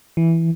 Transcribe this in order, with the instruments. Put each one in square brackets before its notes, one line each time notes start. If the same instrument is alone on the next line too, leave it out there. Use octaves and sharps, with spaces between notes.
[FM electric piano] E3